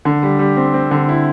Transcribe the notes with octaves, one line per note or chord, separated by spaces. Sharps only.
D3
G3
G3
C4
C4
D3
E4